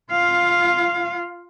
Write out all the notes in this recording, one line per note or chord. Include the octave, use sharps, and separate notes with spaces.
F4 F5